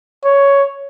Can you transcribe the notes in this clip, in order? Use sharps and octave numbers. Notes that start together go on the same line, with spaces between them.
C#5